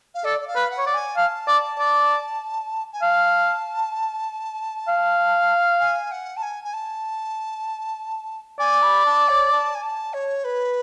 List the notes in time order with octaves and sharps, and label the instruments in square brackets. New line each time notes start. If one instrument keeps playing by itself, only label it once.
[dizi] F5
[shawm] A4 [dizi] D5
[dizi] D5
F5
[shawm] B4
[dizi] F#5
[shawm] C#5
D5
[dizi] G#5
[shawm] F5 [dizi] A5
[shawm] D5
D5
[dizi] G#5
[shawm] F5 [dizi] A5
[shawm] F5
[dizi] G#5
F#5
A5
G#5
G#5
A5
[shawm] D5 [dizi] G#5
[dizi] B5
A5
C#5
A5
G#5
A5
C#5
B4